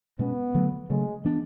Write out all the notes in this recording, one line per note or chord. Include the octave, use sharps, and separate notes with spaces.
B2 G#3 B3 C#4
D3 F#3 A3
C#3 F#3 G#3 A3
E3 B3 D4